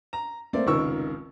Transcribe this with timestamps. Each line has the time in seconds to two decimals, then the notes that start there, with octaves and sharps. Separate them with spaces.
0.13 A#5
0.53 A3 A#3 C4 D5
0.66 F1 C#2 D#3 A#4 C#6 E6